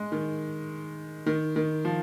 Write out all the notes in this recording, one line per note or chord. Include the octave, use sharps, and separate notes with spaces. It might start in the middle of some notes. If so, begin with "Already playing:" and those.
Already playing: G#3
D#3
D#3
D#3
F3